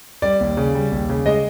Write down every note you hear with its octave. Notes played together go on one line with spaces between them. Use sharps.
G3 D5
D#2
C#3
G3
D#2
C#3
G#3 D#5